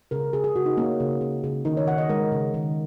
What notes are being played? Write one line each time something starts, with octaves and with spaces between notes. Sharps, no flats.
C#3 A#4
C#3 G#4
G#4
C#3 F#4
D#4
A#3 C#4
C#3
C#3
C#3
D#3 D#4
C#5
D#3 F#5
D#5
G#3 A#4
C#3
D#3